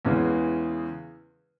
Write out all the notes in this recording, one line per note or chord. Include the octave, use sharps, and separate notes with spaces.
E2 C#3 E3 G#3